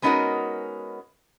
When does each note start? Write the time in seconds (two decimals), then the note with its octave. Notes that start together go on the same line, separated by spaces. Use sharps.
0.02 G#3 B3 C#4 D#4 F#4 A#4